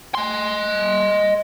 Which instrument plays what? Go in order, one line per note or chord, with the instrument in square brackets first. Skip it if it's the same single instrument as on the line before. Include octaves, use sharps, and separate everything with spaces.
[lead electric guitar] D#5 C6